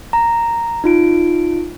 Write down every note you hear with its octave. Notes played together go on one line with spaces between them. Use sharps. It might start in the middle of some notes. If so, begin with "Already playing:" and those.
A#5
D#4 F4 D7